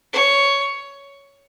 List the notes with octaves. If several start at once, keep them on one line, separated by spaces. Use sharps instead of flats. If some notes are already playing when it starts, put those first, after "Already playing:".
C#5